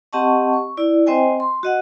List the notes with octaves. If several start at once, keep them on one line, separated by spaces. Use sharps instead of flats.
C4 G4 D#5 F#5 A5 C#6
C#6
E4 D5
C4 C5 D#5 G5 G#5
C6
F#4 D#5 F#5